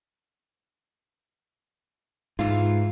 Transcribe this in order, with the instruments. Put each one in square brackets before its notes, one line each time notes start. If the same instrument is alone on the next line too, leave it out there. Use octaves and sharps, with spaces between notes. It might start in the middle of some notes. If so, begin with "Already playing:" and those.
[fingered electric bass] G#2 [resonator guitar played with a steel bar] E3 F4